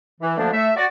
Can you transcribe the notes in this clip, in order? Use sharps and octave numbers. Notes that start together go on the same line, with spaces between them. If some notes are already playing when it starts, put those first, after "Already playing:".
E3
D2 D3 F3 A3 A#3 D4
A3 E5
F#4 D5